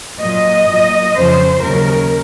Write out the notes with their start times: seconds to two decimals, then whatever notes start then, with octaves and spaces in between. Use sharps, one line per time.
0.19 A#2 F#3 D#5
0.67 A#2 F#3
1.14 F2 C#3 F3 C5
1.62 D#2 C#3 F#3 A#4